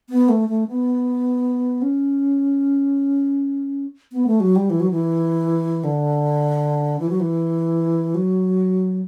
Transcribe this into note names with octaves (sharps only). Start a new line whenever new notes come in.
B3
A3
A3
B3
C#4
B3
A3
F#3
G3
E3
F#3
E3
D3
E3
F#3
E3
F#3